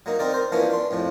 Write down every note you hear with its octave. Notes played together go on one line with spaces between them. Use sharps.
F#3 A#3 D#4
C4 D#4 A#4 D5
A#4 C5
E3 F3 A#3 B3 C#4 D4
D4 C6
F2 A2 F3